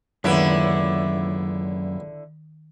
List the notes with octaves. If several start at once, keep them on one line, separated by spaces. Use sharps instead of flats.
C#2 F#2 A#2 D3 D#3 B3 E4 B4